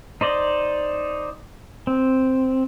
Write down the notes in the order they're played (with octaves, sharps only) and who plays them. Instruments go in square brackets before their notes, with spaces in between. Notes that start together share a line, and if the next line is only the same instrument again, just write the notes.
[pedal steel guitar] D#4 C5 D5 D#5
C4